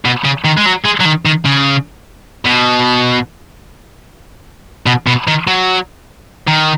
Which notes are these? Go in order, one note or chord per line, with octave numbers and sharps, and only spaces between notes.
B2
C#3
D#3
G#3
F#3
G#3
F#3
D#3
D#3
C#3
B2
B2
B2
D#3
F#3
D#3